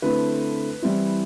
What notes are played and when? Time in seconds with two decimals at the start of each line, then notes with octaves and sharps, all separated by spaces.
0.02 D3 A3 C4 E4 B4
0.82 E3 G3 C4 E4